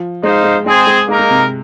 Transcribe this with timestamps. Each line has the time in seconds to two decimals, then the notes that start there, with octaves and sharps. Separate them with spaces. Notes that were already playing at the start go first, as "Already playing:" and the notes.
Already playing: F3
0.23 G#3 D#4 C5 F5
0.44 G#3
0.66 G#3 C4 G#4 C5
0.87 G#3
1.08 G#3 A#3 D#4 A#4
1.19 G#3
1.30 C3